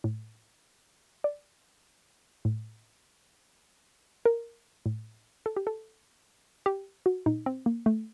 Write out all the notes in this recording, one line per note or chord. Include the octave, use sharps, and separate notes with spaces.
A2
D5
A2
A#4
A2
A4
G4
A4
G4
F#4
A#2 D#4
C4
A#3
A3